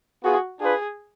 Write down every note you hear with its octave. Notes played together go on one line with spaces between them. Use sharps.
B3 F4 F#4 G#4
D4 F4 G#4 B4